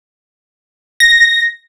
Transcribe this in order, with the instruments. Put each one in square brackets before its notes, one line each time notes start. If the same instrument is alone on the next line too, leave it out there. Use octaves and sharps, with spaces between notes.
[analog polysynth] A#6